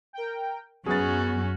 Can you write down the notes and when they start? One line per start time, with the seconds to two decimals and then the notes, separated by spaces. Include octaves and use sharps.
0.13 A#4 G5
0.86 F#2 B3 C#4 F#4 G#4 A6